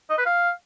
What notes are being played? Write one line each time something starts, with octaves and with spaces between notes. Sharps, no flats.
D#5
B4
F5